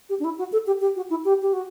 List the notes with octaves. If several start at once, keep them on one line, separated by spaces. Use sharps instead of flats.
G4
D4
E4
F#4
A4
G4
G4
F#4
E4
G4
G4
F#4